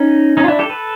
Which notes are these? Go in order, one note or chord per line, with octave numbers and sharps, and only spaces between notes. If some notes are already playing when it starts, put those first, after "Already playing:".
Already playing: C#4 D#4
C#4 D#4
F4
D4 E4
G4 A4
A4 B4